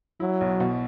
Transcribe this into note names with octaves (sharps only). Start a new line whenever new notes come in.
F#3 E4
B1
B2